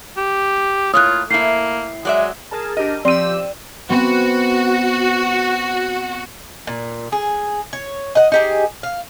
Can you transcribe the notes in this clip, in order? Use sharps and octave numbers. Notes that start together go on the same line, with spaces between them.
G4
A2 A#3 F4 C#5 D#6 F#6
A2 A#3 E4 C7
F#3 G#3 D5 E5
G#4 A#4 A5
D4 G4 A#4 D#5
F3 C4 G4 D5 E6 D#7
B3 C4 F#4
A#2
G#4
C#5
D#5 F#5
D#4 G4 G#4
F5